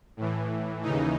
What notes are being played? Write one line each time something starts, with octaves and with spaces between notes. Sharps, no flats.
A2 E3
D#2 C#3 E3 D#4